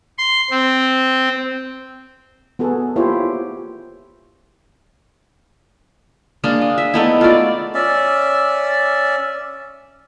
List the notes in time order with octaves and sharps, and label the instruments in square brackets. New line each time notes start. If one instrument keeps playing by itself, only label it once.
[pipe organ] C6
C4
[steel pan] B3 F#4 G#4 A4
A#3 E4 F4 G4 C5 C#5
[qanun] G#3 A#3 D4
D#5
E5
[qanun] A3 B3 E4 [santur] D#4 A4 F#5
[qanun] F4 D5 [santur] F#4 G#4
[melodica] C#4 D5 E5